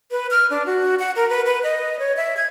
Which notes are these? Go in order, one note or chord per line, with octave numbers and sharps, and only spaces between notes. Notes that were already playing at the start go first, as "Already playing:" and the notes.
B4
F6
D4
F#4
F#5
A#4
B4
B4
D#5
C#5
E5
G#6